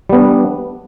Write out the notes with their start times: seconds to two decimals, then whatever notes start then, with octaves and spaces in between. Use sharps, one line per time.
0.09 G3
0.13 B3
0.16 D4